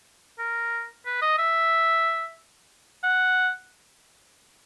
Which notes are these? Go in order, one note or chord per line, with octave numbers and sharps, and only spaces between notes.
A#4
B4
D#5
E5
F#5